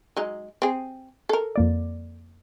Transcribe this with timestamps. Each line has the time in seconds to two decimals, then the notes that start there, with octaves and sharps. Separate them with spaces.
0.17 F#3 G#3 D#4
0.62 C4 G#4
1.29 A4 A#4
1.56 F2 A#3 D5